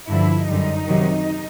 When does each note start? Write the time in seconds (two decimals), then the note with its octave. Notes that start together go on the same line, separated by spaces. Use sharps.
0.08 G2 D3 F3 E4
0.48 F#2 D3 G3 D#4
0.87 C3 D#3 F#3